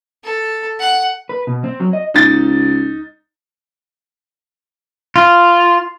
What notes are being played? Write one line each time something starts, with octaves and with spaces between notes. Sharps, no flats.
A4
F#5
B4
B2
C4
F#3
D#5
C#2 D#4 A6
F4